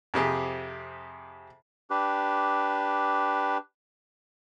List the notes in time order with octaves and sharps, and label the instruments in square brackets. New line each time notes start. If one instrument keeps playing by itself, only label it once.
[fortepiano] F2 C3 G4 G#4
[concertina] D4 G4 B4